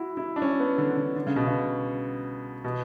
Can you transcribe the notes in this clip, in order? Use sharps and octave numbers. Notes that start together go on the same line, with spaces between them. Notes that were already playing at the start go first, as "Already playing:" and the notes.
Already playing: E4 F#4
E4
D4
C#4
B3
D3
D3
D3
C#3
B2
C#3
B2